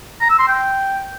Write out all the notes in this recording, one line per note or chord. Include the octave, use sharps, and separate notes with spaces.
A#5
E6
C6
G5